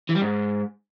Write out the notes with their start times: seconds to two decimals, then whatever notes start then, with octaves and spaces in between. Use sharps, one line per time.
0.09 E3
0.15 G3
0.21 G#2